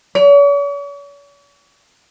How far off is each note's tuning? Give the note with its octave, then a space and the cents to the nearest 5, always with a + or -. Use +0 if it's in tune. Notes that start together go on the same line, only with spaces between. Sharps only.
C#5 +45